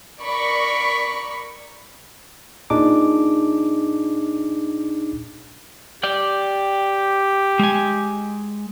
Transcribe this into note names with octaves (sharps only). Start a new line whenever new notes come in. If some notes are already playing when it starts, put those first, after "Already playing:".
A#4 D5 B5 C#6
A#2 D4 D#4 G#4 D6
G4 D5 G5
G#3 G#5